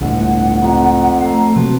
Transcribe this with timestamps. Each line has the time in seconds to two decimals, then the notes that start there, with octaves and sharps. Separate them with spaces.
0.01 G1 C#2 A2 F#5
0.62 F2 A#5
1.21 A3 A4 A#5
1.56 C3 F3 A#3 C4 F#4 B4 A5